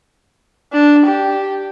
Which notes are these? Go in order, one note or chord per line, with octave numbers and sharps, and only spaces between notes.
D4
G4